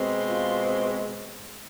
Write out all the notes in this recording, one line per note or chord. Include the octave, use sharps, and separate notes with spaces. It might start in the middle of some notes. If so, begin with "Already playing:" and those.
Already playing: B2 G#3 C4
F4